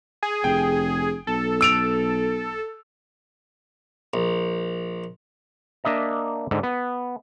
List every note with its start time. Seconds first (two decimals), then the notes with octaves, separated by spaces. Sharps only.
0.23 G#4
0.44 F1 G5
1.27 B1 A4
1.61 E6 D7 F7
4.14 A#1
5.84 A#3 D4 D#5 E5 A#5
6.51 G#2 D3
6.63 B3